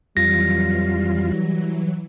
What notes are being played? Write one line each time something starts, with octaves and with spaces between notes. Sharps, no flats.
F2 E3 F#3 G3 F4 A#6